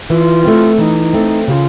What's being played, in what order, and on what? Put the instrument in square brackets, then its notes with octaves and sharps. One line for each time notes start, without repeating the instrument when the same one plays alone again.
[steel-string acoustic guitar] E3 [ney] F4
[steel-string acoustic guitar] A3 C4
[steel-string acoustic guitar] E3 [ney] D#4
[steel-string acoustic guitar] A3 C4
[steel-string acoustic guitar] C#3 [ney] F4 G4